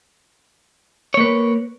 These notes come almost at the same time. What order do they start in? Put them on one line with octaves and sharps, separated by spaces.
C#5 A#3 B4